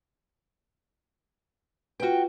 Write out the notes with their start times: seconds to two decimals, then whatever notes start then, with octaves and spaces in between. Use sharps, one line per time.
2.00 F4 F#4 B4 G5